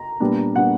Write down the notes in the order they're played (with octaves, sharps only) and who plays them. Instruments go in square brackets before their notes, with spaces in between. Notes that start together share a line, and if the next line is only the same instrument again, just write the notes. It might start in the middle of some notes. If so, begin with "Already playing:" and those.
Already playing: [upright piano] A#5
A#2 G3 B3 D4
A#2 G3 B3 D4 F#5